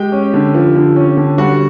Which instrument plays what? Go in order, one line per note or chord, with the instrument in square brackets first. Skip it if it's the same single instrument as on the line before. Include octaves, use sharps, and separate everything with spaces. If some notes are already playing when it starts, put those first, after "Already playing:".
Already playing: [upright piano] G#3 G4 G5
C#4
D3
F3
D3
C#4
D3
G3 F#4 F#5